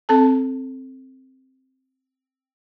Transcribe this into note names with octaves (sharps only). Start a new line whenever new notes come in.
C4 A4 A5